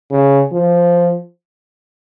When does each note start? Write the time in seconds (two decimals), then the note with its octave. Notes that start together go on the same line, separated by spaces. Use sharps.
0.10 C#3
0.52 F3